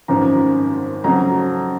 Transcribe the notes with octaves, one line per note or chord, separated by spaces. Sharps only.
G#1 F#2 F3 A#5
F2 C#3 F#3 A#5